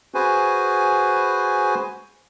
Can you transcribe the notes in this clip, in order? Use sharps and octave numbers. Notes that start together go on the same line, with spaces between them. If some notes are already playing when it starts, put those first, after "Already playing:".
F#4 G#4 B4 C5 G#5